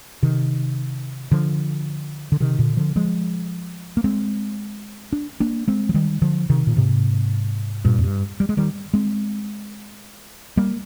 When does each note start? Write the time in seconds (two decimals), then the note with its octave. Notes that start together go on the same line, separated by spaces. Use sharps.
0.23 C3 D#3
1.32 D3 F3
2.32 D3
2.40 C3 D#3
2.59 A#2 D3
2.77 D3 F3
2.96 F3 G#3
3.97 A#3
4.04 G#3 C4
5.13 D4
5.40 A#3 D4
5.68 G#3 C4
5.89 F3
5.94 D#3 G3
6.22 D3 F3
6.49 C3 D#3
6.67 A#2
6.76 G#2 C3
7.85 G2 A#2
7.98 F2
8.04 G2
8.40 G3
8.49 G#3
8.57 D#3 G3
8.94 G#3 C4
10.57 G3 A#3